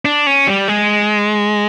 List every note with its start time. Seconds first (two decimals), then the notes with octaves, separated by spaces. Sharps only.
0.05 D4
0.27 C#4
0.47 G3
0.68 G#3